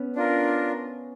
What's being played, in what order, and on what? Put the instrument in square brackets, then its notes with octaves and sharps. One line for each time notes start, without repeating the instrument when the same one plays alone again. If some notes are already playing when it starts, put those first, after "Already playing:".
Already playing: [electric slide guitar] B3 C#4
[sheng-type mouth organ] D4 F4 A#4